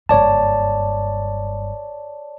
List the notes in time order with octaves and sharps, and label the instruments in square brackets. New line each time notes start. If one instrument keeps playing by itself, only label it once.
[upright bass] F#1 G2 [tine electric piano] C#5 D5 A5